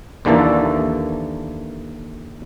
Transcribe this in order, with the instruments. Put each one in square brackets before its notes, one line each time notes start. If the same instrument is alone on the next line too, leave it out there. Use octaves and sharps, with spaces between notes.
[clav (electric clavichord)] D#2 D3 E3 A#3 A4 A5